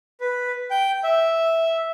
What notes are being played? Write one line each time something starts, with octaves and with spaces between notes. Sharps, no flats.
B4
G5
E5